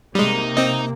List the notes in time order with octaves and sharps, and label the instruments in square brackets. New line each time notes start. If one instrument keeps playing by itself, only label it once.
[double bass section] C3 A#3 [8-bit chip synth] G3 G#3 [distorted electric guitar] D#4
[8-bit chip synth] C4 D#5